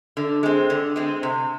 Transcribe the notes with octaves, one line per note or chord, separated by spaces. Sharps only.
D3
G#3 C4
D3
G#3 C4
C3